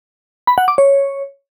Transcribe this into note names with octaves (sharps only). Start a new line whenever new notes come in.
B5
F#5
D6
C#5